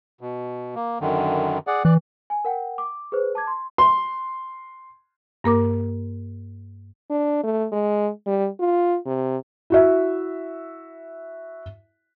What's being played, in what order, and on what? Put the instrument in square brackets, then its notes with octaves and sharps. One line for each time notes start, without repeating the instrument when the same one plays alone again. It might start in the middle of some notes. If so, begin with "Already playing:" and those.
[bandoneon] B2
A#3
F#2 D3 D#3
G#4 D5 F#5
[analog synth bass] E3 [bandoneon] D5 F#6
[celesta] G#5
A#4 F#5 G5
D6
G#4 B4 C5
A5 D6 G#6
C6
[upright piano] C6
[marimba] G2 A#3 A#4 D6
[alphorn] D4
A3
G#3
G3
F4
C3
[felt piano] E4 F#4 E5